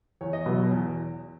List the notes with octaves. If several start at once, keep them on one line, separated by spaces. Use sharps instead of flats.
E2 C#5
D#5
B2 F#3
E2